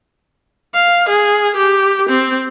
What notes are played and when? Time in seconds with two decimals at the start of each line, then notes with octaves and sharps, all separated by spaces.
0.74 F5
1.08 G#4
1.56 G4
2.09 C4